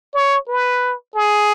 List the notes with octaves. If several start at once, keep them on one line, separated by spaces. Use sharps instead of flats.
C#5
B4
G#4